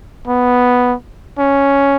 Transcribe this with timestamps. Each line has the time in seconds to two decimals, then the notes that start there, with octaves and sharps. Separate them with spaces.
0.27 B3
1.39 C#4